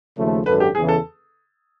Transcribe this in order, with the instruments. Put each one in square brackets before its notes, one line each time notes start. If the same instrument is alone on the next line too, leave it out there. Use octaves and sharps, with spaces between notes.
[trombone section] D#2 C#3 F3 A3
[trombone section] G#1 F#2 D3 [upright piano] B4
[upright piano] G4
[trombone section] E2 C#3 E3 [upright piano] G#4
[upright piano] A4